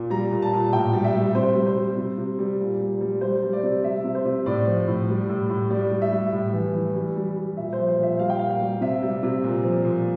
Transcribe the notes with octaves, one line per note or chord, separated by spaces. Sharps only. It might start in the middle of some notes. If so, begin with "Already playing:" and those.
Already playing: A#2
G3 A#5
A#2
A5
A#2
A2 G5
G3
E5
G3
C3 C5
G3
C5
G3
C3
C3
G3
A#2
G3
G3
G3 C5
G3
D5
C3
G3 E5
C3
C5
C3
A2 D5
F3
A2
G3
A2
A2
G3 D5
G3
E5
G3
A2
E3
E3
G3
G3
G3
A#2 E5
C5
F3
C5
A#2 E5
G3 F5
G5
A#2 F5
F5
G3
C3 E5
G3
C3
A#2
F3
A#2